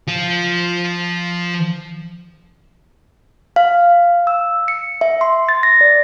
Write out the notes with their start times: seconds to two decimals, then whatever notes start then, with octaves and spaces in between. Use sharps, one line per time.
0.07 F3 F4
3.56 F5
4.27 E6
4.68 C#7
5.01 E5
5.21 C6
5.49 A6
5.63 A#6
5.81 D5